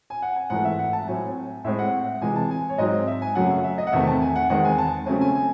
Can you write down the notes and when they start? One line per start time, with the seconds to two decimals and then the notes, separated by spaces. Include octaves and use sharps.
0.10 G#5
0.22 F#5
0.36 G#5
0.50 G#2 E3 A3 F#5
0.65 E5
0.79 F#5
0.93 A5
1.07 A2 F#3 C4 G#5
1.64 A2 G#3 C4 E5
1.79 F#5
2.22 C3 E3 G#3 G#5
2.36 A5
2.51 G#5
2.69 C#5
2.78 G#2 F#3 C4 D#5
3.07 E5
3.22 G#5
3.35 F#2 C#3 F#3 A3 F#5
3.64 E5
3.78 D#5
3.87 F#5
3.92 E2 C3 D#3 A3 C4 E5
4.07 A5
4.21 G#5
4.36 F#5
4.49 E2 D#3 G#3 C4 F#5
4.65 G#5
4.78 A5
5.06 C#3 F#3 A3 C4 G#5
5.21 G#5
5.35 G#5